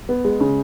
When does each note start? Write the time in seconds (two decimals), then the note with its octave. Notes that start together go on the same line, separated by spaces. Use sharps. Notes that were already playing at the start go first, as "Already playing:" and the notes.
0.09 B3
0.25 G#3
0.40 C#3